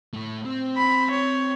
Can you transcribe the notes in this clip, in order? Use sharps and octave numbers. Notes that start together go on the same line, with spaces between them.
A2 A3
C4
B5
C#5